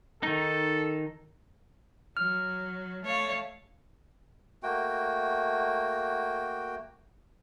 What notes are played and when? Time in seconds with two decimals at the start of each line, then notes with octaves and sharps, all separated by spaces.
0.23 D#3 D#4 A4
2.17 F#3 F6
3.05 A3 C#5 F5
4.63 A3 A#3 F#4 G5